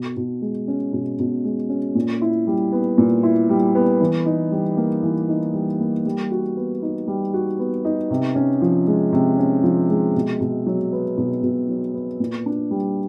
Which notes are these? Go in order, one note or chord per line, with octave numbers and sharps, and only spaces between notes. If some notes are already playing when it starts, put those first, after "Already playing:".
Already playing: B2
B2
G#3
C#4
B2
B2
G#3
C#4
A#2
E4
G3
B3
A#2
E4
G3
B3
E3
D#4
G3
A#3
E3
D#4
G3
A#3
G3
F#4
B3
D#4
G3
F#4
B3
D#4
C3
C#4
F3
G#3
C3
C#4
F3
G#3
B2
B2
F#3
B3
B2
B2
F#3
B3
A#2
D4
G3